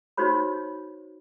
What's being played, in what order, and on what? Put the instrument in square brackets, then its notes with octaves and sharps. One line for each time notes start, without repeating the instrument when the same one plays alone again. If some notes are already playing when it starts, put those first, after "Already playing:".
[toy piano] D#4 F#4 C5 C#5 B5